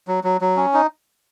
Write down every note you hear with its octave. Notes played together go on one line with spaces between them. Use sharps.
F#3
F#3
F#3
C#4
D#4